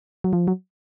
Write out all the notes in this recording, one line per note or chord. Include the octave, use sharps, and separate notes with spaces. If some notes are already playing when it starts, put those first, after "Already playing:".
F#3
F3
F#3